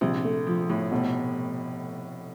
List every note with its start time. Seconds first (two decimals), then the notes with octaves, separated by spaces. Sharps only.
0.01 A#1 C3
0.25 A3
0.47 F3
0.69 A2
0.91 F1 B2